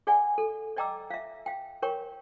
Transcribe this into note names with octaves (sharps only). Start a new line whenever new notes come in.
G#4 D5 F#5 G#5
A4
D5 D#5 G5 A#5 D6 E6
E5 F5
F5 G5
A#4 C#5 G5 C#6